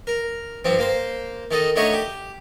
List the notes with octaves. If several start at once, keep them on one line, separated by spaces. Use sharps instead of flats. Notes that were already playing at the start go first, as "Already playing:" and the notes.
A#4
G2 F3 C4
A#3 C5
D#3 A4 D#5
D3 A3 D#4 C#5 D#5 C#6
G4